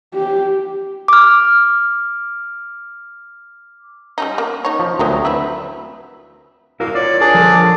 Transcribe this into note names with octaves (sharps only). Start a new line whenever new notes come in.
G4
D6 F6
G3 C#4 D#4
A#3 B3
D#4 C#5
F3
D2 F#3 B3 G4 A#4
C4 E4 B4 E5
E4 F#4 A#4 F5
F4 C#5 D5
D4 G#4 A#4 D5
F3 A4 A#4